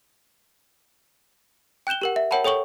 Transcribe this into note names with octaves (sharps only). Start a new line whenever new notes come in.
G5 F#6 G6 E7 G7
G4 A#4 F#5
E5
A#4 C#5 F#5 G5 A5 B5
A4 C#5 G5 C#6 F#7